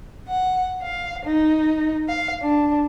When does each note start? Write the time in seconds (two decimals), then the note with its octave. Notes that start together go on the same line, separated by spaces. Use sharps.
0.28 F#5
0.82 F5
1.25 D#4
2.08 F5
2.41 D4